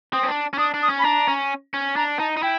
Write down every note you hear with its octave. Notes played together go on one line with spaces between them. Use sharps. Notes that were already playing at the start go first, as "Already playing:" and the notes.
C4 D#6
C#4
D4
C#4
D4 D#6
D4
D#6
C#4
B5
D4 A#5
C#4
C#4
D4 A#5
D#4 A5
D#4
E4 G5